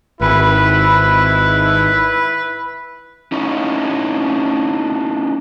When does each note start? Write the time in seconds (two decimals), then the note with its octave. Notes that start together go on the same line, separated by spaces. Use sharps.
0.21 G#1 E4 B4
3.32 C#4 D#4 E4